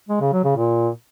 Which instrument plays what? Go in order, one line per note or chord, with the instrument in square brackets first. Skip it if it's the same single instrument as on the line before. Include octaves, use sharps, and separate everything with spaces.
[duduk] G#3
C#3
F#3
C#3
A#2